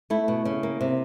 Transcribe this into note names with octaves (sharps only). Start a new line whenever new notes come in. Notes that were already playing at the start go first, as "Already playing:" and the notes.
A3 E4
B2
C#3
A#3
C3